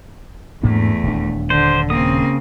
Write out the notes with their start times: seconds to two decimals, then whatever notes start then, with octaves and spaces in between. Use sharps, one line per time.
0.63 E2 G#2 A3 A#3 D4
1.03 D#1 D4
1.50 D3 C5
1.90 C#3 A#3 C4 D#6